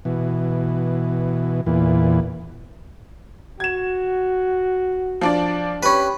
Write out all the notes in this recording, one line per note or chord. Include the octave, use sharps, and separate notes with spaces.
B2 E3
E2 A#2 E3
F#4 G#6 E7
F3 D4 D5
C#4 G4 B4 B5